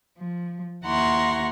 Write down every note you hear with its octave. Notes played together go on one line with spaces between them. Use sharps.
F3
D#2 E4 F#5 A#5 C6 C#6